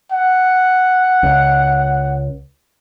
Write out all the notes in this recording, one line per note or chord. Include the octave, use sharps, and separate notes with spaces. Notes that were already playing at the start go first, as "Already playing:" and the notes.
F#5
C#2